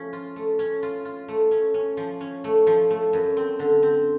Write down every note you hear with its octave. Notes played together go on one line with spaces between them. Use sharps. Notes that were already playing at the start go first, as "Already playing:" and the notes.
Already playing: F3 A3 C#4
F4
A3
C#4
F4
F4
A3
C#4
C#4
F3
C#4
A3
F3
A3
F#2
C4
D3
C4